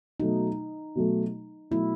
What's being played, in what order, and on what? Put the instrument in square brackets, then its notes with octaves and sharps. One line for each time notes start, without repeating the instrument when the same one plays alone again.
[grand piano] B2 F#3 A3 [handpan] D#4
[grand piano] B2 F#3 A3
[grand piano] B2 F#3 A3 [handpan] E4